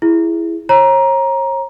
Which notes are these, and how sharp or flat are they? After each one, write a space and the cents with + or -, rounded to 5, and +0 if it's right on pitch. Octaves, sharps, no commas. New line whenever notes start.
E4 +10 G#4 +0
C#5 -40 A#5 +15